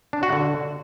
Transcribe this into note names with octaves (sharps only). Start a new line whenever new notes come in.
D4
F#4
D3